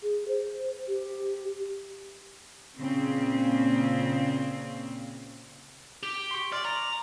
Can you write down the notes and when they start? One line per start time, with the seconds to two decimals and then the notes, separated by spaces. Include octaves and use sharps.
0.03 G#4
0.28 C5
0.88 G4
2.80 A#2 C#3 C4
6.03 G4
6.31 C6 C#6
6.52 D5 C6 D6 F6
6.65 A#5